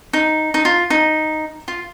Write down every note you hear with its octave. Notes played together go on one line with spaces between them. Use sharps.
D#4
D#4
F4
D#4
F4